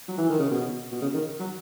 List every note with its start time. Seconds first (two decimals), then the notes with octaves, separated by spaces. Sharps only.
0.08 F#3
0.18 E3
0.30 D#3
0.39 C#3
0.51 B2
0.92 B2
1.02 C#3
1.14 D#3
1.40 F#3